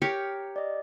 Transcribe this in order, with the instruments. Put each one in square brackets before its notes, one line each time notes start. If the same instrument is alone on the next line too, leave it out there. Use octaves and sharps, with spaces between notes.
[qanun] G4 A#4 C#5
[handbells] D5 D#5